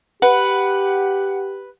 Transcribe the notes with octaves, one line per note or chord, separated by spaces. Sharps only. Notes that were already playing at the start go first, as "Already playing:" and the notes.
G4 B4 F#5